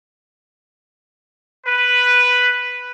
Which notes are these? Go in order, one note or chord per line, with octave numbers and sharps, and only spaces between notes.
B4